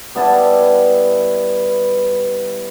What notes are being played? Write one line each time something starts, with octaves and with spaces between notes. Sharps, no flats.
G3 B3 E4 A5